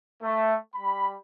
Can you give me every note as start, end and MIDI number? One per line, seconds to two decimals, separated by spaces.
0.23 0.54 57
0.75 1.13 55
0.75 1.13 83